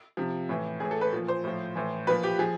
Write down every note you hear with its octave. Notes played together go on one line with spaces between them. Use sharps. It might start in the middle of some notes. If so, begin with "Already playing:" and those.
C3 F3
A2 E3
A2 E3 G#4
A4
B4
A#2 F3
C5
A2 F3
A2 E3
A#2 F3 B4
G4
F3 G#4